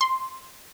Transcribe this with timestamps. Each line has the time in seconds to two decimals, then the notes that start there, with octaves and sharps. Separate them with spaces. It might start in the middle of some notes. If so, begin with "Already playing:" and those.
0.01 C6